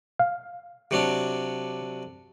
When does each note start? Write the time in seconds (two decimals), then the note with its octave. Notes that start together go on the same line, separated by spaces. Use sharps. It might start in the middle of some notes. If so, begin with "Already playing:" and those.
0.19 F5
0.91 C3 F#3 D4